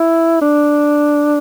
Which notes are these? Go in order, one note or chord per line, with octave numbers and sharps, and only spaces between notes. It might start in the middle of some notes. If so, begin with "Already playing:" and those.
Already playing: E4
D4